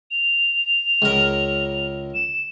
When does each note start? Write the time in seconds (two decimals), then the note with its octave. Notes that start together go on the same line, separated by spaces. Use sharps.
0.11 F7
1.02 C#2 A#4
2.14 E7